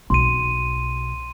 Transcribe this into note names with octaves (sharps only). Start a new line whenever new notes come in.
B1 C6 D#7